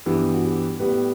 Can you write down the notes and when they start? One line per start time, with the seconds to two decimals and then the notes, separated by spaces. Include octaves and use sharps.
0.06 G2 E3 B3 G4
0.34 F#4
0.42 G4
0.79 A2 G3 B3 G4 B4